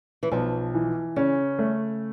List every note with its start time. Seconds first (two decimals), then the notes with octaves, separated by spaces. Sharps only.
0.23 E3
0.31 B1 F3
0.74 E3
1.16 C#3 C#4
1.59 A3